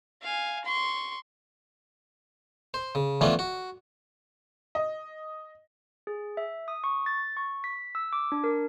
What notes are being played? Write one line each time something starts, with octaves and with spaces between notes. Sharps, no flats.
F5 G#5
C6 C#6
C5
C#3
E3 F3 A3 B3 C#4 D4
F#4
D#5
G#4
E5
D#6
C#6
A6
C#6
B6
E6
D6
D4
A#4